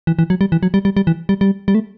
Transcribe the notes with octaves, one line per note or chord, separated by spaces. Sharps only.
E3
E3
F#3
G3
E3
F#3
G3
G3
G3
E3
G3
G3
G3
A3